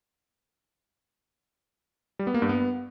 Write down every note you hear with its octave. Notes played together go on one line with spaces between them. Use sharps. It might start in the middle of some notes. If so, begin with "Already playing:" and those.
G3
B3
A#3
G2
B3